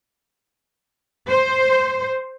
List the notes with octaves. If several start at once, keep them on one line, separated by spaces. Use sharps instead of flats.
C5